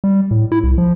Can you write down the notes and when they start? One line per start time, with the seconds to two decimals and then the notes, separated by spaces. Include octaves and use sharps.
0.04 G3
0.31 A2
0.52 E4
0.64 C2
0.78 F3